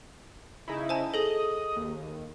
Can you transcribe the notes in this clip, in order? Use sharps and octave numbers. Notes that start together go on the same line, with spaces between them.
C#3 D#4 E4
C5 G#5 A5
G#4 A4 D#5
D#2